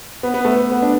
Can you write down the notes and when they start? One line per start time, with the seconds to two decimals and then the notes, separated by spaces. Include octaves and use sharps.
0.23 B3
0.34 B3
0.45 A3
0.56 B3
0.72 B3
0.82 D4